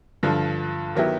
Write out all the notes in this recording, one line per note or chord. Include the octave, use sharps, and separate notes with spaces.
G2 D3 F3
D#3 F#3 B3 E4 G4